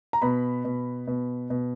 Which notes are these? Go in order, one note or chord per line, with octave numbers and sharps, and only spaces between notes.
A#5
B2 B5
B2
B2
B2